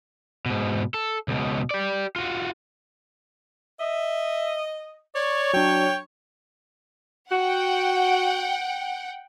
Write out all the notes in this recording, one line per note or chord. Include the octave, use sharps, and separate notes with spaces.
G#2 B2
A4
C#2 B2
G4 D5
F4 F#4
D#5 E5
C#5 D5
F#3 D4 G5
F#4 F#5 G5